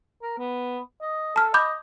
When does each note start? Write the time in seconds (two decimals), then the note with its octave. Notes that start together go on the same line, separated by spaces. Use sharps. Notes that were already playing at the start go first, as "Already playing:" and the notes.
0.22 A#4
0.39 B3
1.02 D#5
1.36 A4 A5 F6
1.54 D#5 B5 D6 G6